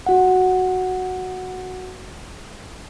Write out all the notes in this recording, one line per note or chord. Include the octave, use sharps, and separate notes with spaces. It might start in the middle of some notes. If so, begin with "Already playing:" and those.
F#4 F#5